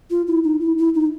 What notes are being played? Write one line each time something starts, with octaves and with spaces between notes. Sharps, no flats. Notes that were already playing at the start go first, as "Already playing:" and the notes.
F4
E4
D#4
E4
E4
D#4